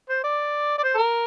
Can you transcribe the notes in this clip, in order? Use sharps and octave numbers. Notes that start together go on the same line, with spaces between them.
C5
D5
D5
C5
A4
A#4